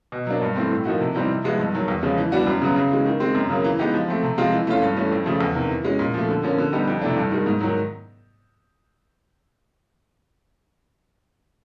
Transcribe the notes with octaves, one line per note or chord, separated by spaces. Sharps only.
B2
F#3 A#3 D4
G2
E3 A3 C4
A2
F3 A#3 D#4 F#4
C3
E3 G3 C4 D#4
C3
F3 G#3 B3 E4
G2
D#3 F#3
E2
C#3 F3 G#3 C#4
E3
G3 B3 D4 F#4
F#2
C#3 F#3 B3
C#3
E3 G#3
D#3
G#3 C4
F#2
C#3 F#3 A#3
E3
G#3 B3 D#4 G4
F3
A3 C4
C3
F3 G#3 C4 F4
E3
A3 C#4 F4
G2
E3 A3 C#4
F2
C#3 F3 A3
E2
C3 D#3
E3
G#3 C#4
A#2
F3 A3
D3
F3 A#3 C#4
D3
G3 B3 D#4 G4
F2
C3 E3 A3 D4
G2
D#3 G#3
G#2
D#3 F#3